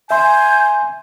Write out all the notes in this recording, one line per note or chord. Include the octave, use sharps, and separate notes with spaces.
E5 G#5 C6 G6